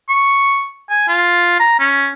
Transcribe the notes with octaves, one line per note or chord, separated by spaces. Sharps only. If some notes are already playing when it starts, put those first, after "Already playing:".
C#6
G#5
F4
A#5
C#4